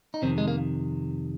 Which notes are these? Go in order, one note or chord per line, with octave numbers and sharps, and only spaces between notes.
D#4
F2 C3 D#3 C4
G#3
A#3